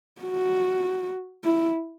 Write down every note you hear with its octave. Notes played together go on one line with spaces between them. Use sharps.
F#4
E4